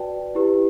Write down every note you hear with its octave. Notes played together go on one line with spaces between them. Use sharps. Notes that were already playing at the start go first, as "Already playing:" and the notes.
Already playing: F#4 B4 D5 G5 A5
E4 G4 B4